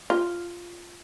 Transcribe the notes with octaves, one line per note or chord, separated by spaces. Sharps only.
F4